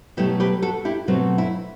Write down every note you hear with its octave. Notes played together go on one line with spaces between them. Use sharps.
B2 F#3 A3 E4 G4
G4 B4
F#4 A4
E4 G4
B2 F#3 A3 C4 F#4
E4